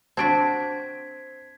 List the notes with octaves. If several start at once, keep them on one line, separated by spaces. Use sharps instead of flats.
C4 D4 F#4 C5 A5 G#6 B6 D7